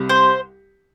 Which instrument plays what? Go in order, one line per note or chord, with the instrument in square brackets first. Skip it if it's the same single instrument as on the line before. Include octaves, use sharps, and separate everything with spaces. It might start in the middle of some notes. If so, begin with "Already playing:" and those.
Already playing: [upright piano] C2 C3 G3
[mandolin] C5